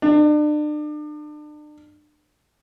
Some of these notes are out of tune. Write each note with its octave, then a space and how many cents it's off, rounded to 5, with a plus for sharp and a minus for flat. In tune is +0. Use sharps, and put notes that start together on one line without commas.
D4 +35